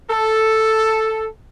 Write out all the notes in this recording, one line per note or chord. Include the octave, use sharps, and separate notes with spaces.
A4